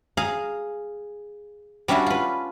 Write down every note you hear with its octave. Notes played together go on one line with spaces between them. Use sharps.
G#4 F5 A#5
G3 C#4 D4 E4 F#4
F4 B4